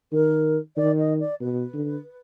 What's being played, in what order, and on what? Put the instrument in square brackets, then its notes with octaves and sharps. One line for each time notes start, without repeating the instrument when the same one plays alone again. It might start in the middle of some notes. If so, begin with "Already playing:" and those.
[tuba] D#3 [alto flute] A#4
[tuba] D#3 [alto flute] D5
[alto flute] D#5
D5
[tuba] B2 [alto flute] B4
[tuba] D3